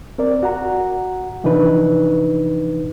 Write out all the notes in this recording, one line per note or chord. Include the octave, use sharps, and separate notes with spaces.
C4 A#4 D5
F#4 F#5 A#5
C3 E3 F3 D4 D#4 B4